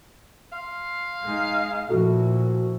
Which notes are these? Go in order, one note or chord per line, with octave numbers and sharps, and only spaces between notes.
F5 C6
G#3 D#4
A#2 F3 E4 F#4 A4